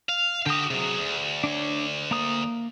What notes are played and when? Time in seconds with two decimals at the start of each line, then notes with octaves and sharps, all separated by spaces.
0.09 F5
0.46 D3 F#4 G4 D#6
0.71 C3 F#3 G#4
0.98 D2
1.44 D4 C#5
2.11 A#3 A#5 D#6